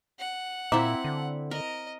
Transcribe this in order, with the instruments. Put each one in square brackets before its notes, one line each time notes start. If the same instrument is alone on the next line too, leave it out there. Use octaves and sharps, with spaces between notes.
[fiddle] F#5
[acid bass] A#2 [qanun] C4 E4 [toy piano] F5 A#5 D6
[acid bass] D3
[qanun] A#4 [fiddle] D#5